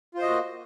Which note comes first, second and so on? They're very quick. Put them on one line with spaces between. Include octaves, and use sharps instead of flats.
F4 C5 D#5 F#4 A#3